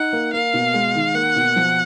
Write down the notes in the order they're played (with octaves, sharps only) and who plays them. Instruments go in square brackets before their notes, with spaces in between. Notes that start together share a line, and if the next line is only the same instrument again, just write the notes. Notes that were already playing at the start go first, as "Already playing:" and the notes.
Already playing: [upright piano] D#4 [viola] F#5
[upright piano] A#3
[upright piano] A#3 [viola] F5
[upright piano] B2
G#3
D#3
[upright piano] A#3 [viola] F#5
[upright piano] B2
F3